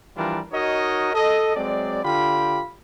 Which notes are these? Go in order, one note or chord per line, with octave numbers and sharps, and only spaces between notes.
E3 F3 G3 D4 F4 A#4
D#4 F#4 A#4 C#5 D#5
A4 D#5
F#3 G#3 C4 D5
D3 F4 G4 G5 B5